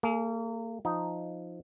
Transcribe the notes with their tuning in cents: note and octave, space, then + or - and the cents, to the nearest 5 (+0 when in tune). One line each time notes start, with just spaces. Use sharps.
A#3 -30 G#4 +30
F3 +0 D#4 +0